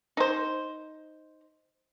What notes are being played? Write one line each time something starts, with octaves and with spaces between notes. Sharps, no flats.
D#4 C5